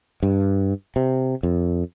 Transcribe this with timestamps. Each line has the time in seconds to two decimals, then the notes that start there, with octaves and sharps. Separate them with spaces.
0.23 G2
0.96 C3
1.43 F2